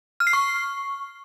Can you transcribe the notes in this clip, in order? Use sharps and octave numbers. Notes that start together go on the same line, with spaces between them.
F6
C7
C#6